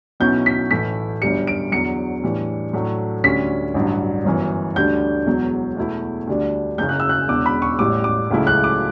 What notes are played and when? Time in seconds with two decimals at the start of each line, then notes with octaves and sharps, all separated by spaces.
0.20 B1 B2 F#3 C#4 E4 G6
0.46 B6
0.71 A1 A2 E3 A3 E4 B6
1.22 G1 F#2 D3 G3 C#7
1.47 D7
1.72 E2 D3 F#3 C#7
2.23 A2 E3 G3 D4
2.73 A2 F#3 A3 D4
3.24 D2 D3 G3 C#4 B6
3.74 A1 G2 D3 F#3
4.25 G1 F#2 E3
4.76 D2 D3 G3 D4 G6
5.26 E1 E2 B2 F#3
5.77 E2 B2 A3 E4
6.27 D2 D3 G3 D4
6.78 F#1 F#2 C#3 G6
6.89 F#6
7.00 E6
7.09 F#6
7.29 E1 E2 D3 D6
7.46 B5
7.62 C#6
7.79 A1 A2 G3 D6
8.04 D6
8.30 C#2 C#3 F#3 A3 E4
8.47 F#6
8.64 D6